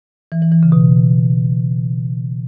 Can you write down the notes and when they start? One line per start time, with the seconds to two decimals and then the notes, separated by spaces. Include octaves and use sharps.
0.32 E3
0.42 E3
0.52 E3
0.63 C#3
0.72 B2